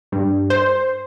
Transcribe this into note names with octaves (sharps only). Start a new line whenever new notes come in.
G2
C5